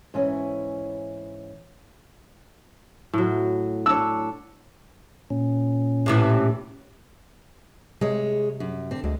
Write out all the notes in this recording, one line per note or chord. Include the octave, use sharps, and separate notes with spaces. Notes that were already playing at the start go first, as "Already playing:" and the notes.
G#2 E3 C#4 E4 C#5
A2 F#3
D4 C#5 E6
A#2 C#4
A2 C3 E3
C3 G#3 G#4 C#5
F#2
D3 C4
D2 G#3